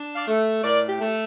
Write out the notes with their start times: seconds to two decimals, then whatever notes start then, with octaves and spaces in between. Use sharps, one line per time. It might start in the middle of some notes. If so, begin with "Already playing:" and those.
Already playing: D4
0.15 D5 F5
0.27 A3
0.63 A2 A#4 D5
0.88 G4
1.00 A3